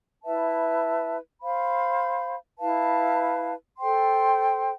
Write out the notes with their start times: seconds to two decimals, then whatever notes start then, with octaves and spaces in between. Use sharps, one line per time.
0.23 E4 B4 E5 A5
1.42 C5 F5 B5
2.59 E4 B4 F5 A5
3.77 A4 C5 G5 C6